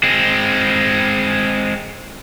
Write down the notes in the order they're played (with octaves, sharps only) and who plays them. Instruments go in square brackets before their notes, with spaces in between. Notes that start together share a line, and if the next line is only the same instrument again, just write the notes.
[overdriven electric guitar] G#3 C4